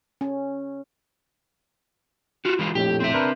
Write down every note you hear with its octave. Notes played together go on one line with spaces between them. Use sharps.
C#4
F4 F#4
E3 G#3 F4
A#1 F2 A2 G4
C4 E5
D4 A#4 B4